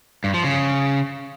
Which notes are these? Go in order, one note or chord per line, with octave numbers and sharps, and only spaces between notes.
G2
F3
C#3